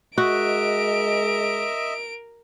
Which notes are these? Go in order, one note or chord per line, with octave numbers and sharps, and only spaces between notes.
G#3 F#4 A#4 D#5 E5 D7